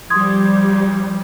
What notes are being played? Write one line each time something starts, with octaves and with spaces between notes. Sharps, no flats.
F3 G3 C6 D#6 G#6